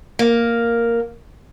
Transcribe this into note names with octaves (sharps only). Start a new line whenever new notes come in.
A#3